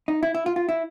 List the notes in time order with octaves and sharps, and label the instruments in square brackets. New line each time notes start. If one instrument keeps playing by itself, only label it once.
[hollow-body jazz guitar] D#4
E4
E4
F4
F4
E4